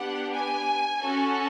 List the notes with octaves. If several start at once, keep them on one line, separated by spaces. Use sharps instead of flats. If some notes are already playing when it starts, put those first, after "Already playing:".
Already playing: B3 D4 G4 F#5
G#5
C#4 F#4 A4